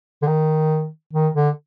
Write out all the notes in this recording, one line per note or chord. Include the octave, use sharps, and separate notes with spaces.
D3
D#3
D#3
D3